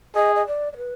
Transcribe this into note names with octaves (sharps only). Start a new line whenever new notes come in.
G#4 D#5
D#5
D5
D5
B4